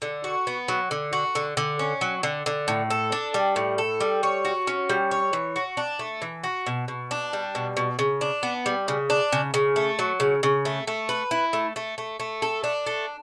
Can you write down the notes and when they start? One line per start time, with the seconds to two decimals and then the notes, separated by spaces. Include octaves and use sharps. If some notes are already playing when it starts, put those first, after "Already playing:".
0.02 D3
0.24 F#4
0.47 B3
0.68 F#3
0.91 D3
1.13 F#4
1.35 D3
1.57 D3
1.79 C#4
2.01 F#3
2.23 D3
2.46 D3
2.68 A2
2.90 A4
3.12 D4
3.34 G3
3.56 A2
3.78 A4
4.00 G3
4.23 C#5
4.45 F#4
4.67 C#4
4.89 G3
5.11 C#5
5.33 E3
5.56 F#4
5.77 D4
5.99 A3
6.22 E3
6.44 F#4
6.66 B2
6.88 B2
7.11 D4
7.33 G3
7.55 B2
7.77 B2
7.99 C#3
8.21 D4
8.43 B3
8.66 G3
8.88 C#3
9.10 D4
9.32 C#3
9.54 C#3
9.76 A3
9.99 F#3
10.20 C#3
10.43 C#3
10.65 A3
10.87 A3
11.09 B4
11.31 E4
11.53 A3
11.76 A3
11.98 A3
12.20 A3
12.42 A4
12.64 D4
12.86 A3